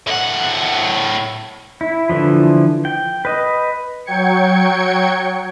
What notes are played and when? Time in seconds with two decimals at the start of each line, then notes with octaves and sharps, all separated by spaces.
0.07 A2 F#5
1.81 E4
2.09 D3 E3 F3
2.85 G5
3.25 B4 D#5
4.05 F#3 G5 G#6 C#7